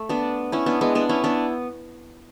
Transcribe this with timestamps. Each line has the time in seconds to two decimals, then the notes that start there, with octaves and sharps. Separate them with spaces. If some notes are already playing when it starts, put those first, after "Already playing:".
Already playing: A3
0.09 B3 D4
0.52 C#4 E4
0.66 B3 D4
0.81 G#3 B3
0.95 B3 D4
1.09 C#4 E4
1.24 B3 D4